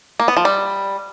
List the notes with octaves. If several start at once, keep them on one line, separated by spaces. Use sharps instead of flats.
A#3
B3
F3
G3